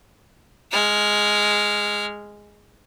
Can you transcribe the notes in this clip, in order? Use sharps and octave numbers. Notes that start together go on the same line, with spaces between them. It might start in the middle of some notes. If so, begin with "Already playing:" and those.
G#3 F6